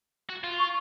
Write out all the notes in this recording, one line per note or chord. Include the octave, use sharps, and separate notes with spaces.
F#4
F4
C#6